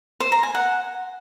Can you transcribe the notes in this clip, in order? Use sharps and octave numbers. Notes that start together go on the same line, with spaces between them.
C5
A#5
G#5
F#5